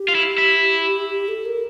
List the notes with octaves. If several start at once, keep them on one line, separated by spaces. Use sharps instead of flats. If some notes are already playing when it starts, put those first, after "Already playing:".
Already playing: G4
F4
E4
E4
A4
A#4